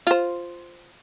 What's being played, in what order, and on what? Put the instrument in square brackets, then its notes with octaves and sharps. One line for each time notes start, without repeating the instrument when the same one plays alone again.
[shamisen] F4 C5